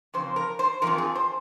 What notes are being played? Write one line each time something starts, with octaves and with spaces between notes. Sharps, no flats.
F2 C#3 C5
A#4
C5
F2 C3 F3 A#4
G#4
C5